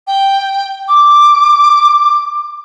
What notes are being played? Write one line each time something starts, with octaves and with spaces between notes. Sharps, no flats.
G5
D6